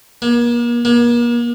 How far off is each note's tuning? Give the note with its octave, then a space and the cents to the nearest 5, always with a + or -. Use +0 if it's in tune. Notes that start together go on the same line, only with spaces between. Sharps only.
A#3 +40
A#3 +40